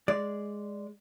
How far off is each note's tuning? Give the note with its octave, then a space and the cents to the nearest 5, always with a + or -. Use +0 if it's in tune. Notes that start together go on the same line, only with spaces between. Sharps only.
G#3 +0 D5 +0